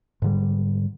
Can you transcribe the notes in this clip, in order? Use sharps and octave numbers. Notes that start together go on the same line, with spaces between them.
G#2 D3 G3